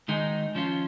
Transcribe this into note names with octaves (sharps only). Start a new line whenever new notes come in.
D#3 G#3 D#4
F3 C#4 F4